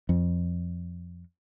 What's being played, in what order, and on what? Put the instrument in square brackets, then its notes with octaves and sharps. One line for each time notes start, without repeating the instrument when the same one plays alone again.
[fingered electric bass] F2